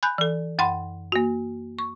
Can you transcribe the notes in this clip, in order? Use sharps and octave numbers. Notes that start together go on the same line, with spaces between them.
G#5 B5 F#6 G6
E3 A4
F#2 F#5 B5 C6
A#3 F#4
C#6